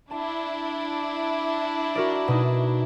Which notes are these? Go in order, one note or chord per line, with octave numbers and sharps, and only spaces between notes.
D4 E4 A5
F#4 A#4 D5
B2 D#4